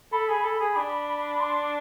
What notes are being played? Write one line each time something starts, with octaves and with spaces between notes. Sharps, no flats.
A4 B5
G#4
A4
G#4
D4
C6